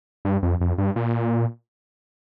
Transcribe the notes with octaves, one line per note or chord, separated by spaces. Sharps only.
G2
F2
F2
G2
A#2